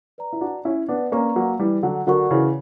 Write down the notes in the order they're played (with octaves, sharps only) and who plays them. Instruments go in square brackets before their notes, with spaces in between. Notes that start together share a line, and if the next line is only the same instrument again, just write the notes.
[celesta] B4 D5 A#5
[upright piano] E4
D4 F#4
C#4 E4
B3 D4
[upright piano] A#3 C#4 [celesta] B4 D5 A#5 C#6
[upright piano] F#3 A#3
E3 G3
D3 F#3
[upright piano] D3 F#3 [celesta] F#4 A#4 D5 F#5 C#6
[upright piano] C#3 E3